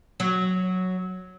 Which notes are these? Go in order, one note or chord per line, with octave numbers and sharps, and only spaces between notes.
F#3